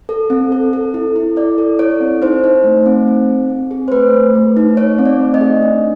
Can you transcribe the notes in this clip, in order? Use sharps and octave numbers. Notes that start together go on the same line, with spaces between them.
A4
C4
A4
A4
E4
E4
E4 D5
A4
E4 C#5
C4
D#4 C5
D#4
A3
C4
C4
G#4
C4
G#4
C5
A3 B4
A3
A3
D#4
D#4 C#5
C4
D5
A3
D#5
G#4
D4